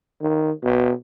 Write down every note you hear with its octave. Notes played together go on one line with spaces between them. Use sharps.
D#3
B2